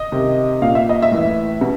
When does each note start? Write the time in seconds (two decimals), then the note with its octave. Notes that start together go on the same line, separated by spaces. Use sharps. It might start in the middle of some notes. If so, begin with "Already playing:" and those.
Already playing: D#5
0.12 C3 D#3
0.62 A#2 F5
0.75 E5
0.89 D#5
1.02 E5
1.11 A2 E3
1.61 B2